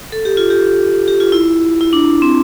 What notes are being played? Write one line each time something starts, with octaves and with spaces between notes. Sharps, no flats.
A4
G4
F4
G4
G4
F4
E4
E4
D4
C4